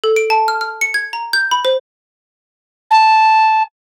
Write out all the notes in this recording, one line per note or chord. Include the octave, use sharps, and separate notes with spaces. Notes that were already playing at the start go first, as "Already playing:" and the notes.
A4
D7
A5
F6
F6
C#7
G#6
A#5
G6
B5
C5
A5